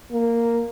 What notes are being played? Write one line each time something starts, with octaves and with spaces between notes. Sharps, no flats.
A#3